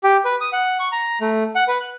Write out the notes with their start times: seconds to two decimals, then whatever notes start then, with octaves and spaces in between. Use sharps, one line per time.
0.04 G4
0.25 B4
0.41 D#6
0.53 F#5
0.80 C#6
0.92 A#5
1.21 A3
1.55 F#5
1.68 B4
1.80 F#6